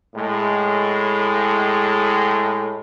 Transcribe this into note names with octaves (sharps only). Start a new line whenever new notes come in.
A2 G#3